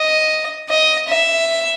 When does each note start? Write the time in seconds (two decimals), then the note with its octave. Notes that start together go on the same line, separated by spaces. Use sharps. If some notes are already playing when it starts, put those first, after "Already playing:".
Already playing: D#5
0.70 D#5
1.09 E5